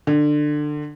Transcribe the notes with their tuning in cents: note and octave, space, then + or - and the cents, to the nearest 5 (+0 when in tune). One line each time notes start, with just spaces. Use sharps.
D3 +20